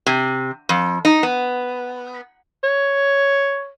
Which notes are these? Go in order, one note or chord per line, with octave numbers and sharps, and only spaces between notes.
C3
F2
D#4
B3
C#5